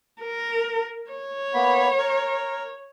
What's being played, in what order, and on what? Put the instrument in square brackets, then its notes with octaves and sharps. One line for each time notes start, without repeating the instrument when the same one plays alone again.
[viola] A#4
C#5
[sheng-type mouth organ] A#3 B3 B5
A#4